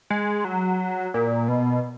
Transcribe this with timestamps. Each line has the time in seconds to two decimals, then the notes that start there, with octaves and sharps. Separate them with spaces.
0.10 G#3
0.45 F#3
1.14 A#2
1.48 B2